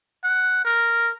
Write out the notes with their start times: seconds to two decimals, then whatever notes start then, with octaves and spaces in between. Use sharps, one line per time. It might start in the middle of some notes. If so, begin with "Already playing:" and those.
0.24 F#5
0.65 A#4